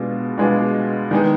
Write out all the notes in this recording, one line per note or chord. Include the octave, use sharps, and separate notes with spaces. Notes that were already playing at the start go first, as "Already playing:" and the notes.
Already playing: B2 G#3 B3 D4 F4
B2 G#3 B3 D4 F4
D#3 G#3 B3 D#4